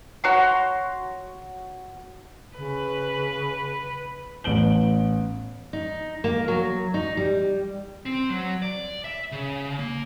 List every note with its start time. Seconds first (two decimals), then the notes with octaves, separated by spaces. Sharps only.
0.24 F#4 C#5 A#5 C6
2.57 C#3 B4
4.44 A1 B3 D7 F#7 G7
5.73 D#4
6.24 A#3
6.48 F#3
6.94 D#4
7.17 G3
8.06 C4
8.30 F#3
8.62 D5
9.04 E5
9.32 C#3
9.79 A#3